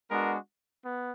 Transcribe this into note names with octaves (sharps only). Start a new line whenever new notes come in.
G#3 B3 D4 F#4 A#4
B3